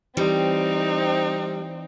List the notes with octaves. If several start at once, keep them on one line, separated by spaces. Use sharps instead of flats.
E3 G3 C4 D#4